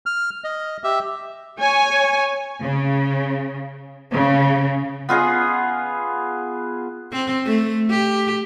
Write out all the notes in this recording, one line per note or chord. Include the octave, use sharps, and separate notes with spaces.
F6
D#5
G4 E5
C#5 G#5
C#3
C#3
B3 F4 G#4 D#5
C4
A3
G4